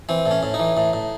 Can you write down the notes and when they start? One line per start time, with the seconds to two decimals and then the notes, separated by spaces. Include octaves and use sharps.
0.09 E3 C4
0.26 A2
0.31 C#4
0.43 A2
0.54 D#4
0.59 E3
0.77 A2
0.93 A2